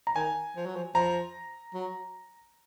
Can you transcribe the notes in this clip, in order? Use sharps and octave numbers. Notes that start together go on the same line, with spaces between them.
A#5
D#3 G#5
F3
F#3
F3
F3 A#5
F#3